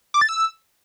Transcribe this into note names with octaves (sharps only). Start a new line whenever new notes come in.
D6
A6
E6